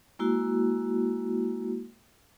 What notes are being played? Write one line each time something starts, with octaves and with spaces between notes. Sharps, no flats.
G#3 A#3 E4 F#4